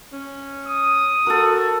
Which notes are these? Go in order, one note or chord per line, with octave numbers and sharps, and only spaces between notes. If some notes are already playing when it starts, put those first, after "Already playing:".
C#4
D#6
F#4 A4 A#4